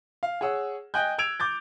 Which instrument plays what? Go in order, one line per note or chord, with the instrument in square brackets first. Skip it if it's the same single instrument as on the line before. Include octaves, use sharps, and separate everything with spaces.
[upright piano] F5
G#4 C#5 F#5 E6
D#5 G5 G#5 F#6 G6
E6 G#6 D7 F7
D6 G6 A6